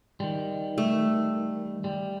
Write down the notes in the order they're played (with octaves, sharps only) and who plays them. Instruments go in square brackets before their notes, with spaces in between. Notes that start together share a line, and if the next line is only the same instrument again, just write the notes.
[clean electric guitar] D#3 G3
[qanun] A3
[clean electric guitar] G3